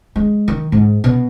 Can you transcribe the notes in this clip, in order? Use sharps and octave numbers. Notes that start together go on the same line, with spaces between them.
G#3
D#3
G#2
B2